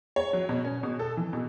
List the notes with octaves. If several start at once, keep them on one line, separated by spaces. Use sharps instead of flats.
C#5
F#3
B2
C#4
B2
A4
E3
B2